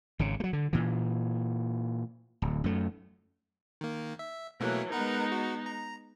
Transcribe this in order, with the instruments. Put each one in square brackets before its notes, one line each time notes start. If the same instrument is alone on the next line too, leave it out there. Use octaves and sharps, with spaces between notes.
[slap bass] G#1 C#3
F#3 A3
D3
A#2 E3
D1
F#2 A3
[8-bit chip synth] D#3 A#3
E5
[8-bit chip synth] B2 A3 A#3 [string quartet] E3 F#3
[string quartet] G#3 B3 D#4 [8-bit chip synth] A#4 B4 F#5
[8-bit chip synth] F#4
A#5